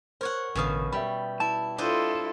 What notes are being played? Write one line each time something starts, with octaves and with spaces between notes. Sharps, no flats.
A#4 C5 C#5 F#5
A1 F#2 B2 D3 F5 D#6
G3 E5 G5 B5
E4 A5
D4 E4 F4 A4 C5 D#5